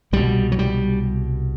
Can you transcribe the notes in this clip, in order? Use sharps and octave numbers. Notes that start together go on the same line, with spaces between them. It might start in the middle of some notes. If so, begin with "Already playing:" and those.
C2 B2 G3
F#3
G3